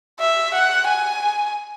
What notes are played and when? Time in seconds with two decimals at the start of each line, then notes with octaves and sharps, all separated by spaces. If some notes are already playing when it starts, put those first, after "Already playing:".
0.20 E5
0.54 F#5
0.88 G#5